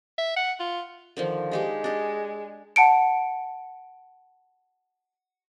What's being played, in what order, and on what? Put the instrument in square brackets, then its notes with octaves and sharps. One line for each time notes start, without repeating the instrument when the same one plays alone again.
[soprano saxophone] E5
F#5
F4
[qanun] D3 D#3 F3
[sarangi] G#3 [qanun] D4 D#4 G4
[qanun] D4 G4 D#5
[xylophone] F#5 A5 C#7 D7